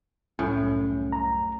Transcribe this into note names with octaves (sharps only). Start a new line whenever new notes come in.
C2 F#2 A2 C#4
A#5